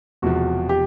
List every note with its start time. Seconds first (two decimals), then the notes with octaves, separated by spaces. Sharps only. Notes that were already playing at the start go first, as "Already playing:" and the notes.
0.22 E1 E2 C3 F3 F#4
0.69 G4